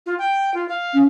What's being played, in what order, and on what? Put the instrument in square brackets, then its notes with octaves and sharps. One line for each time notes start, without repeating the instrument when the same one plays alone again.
[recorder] F4
G5
F4
F5
[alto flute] C#4